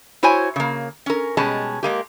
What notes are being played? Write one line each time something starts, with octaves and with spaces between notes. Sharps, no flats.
E4 F#4 C5 C#5 G#5
C#3 A#3
C#4 A#4
B2 G3 G#3 C#4 A5
G#3 A#3 G4